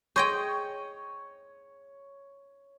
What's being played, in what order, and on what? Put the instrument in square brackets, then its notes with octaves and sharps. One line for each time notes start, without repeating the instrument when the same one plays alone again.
[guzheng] G#4 D#5 G5 [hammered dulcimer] C#5 [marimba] C6 G6